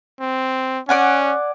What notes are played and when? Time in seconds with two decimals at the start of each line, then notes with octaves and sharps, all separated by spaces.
0.21 C4
0.89 C#4 D5 F#5 G#5